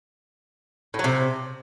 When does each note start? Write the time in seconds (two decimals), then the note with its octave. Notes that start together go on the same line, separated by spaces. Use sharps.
0.94 A2
0.99 F#3
1.04 C3